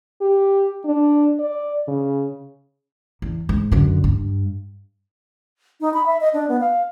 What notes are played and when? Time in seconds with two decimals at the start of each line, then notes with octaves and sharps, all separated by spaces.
0.21 G4
0.85 D4
1.40 D5
1.88 C#3
3.22 E2
3.49 G#2
3.72 F#2 D3
4.04 G2
5.81 D#4
5.94 B5
6.06 E5
6.21 D#5
6.34 D4
6.49 B3
6.60 F5